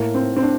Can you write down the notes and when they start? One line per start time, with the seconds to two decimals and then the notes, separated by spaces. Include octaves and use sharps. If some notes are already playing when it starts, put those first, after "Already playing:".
Already playing: A2 A#3
0.15 C4
0.37 C4
0.42 D4